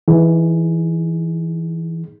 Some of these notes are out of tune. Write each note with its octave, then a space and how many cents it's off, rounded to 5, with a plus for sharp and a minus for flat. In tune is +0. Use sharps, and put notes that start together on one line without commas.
E3 +0 D#4 +25 G#4 +0